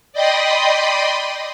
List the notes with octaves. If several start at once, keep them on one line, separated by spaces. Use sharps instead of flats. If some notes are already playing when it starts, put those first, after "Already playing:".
D5 D#5 G5 B5 C6 D#6